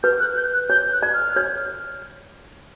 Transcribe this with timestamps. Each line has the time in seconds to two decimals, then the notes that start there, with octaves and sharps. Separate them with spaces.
0.03 B4 G6
0.20 F#6
0.36 G6
0.53 F#6
0.70 C#5 G6
0.92 F#6
1.03 D5
1.14 F6
1.36 C#5